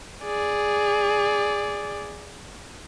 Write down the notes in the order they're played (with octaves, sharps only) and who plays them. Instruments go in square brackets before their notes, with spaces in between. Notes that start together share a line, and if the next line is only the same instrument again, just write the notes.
[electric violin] G#4 D5